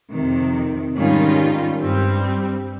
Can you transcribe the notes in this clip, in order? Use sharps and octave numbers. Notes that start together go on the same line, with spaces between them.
F2 C3 D#3
G#2 D#3 G3 C#4 F4
G2 G3 C4